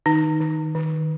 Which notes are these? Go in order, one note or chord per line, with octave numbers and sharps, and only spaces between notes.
D#3 D#4
D#3
D#3